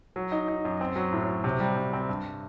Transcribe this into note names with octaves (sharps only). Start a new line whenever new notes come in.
F#3
D#4
D#4
F#2
C4
F#3
A2
F#3
C3
G3
C3
C4
G2